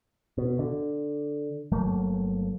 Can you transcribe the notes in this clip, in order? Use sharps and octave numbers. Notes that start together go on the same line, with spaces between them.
B2
D3
G1 F#3 A3 A#3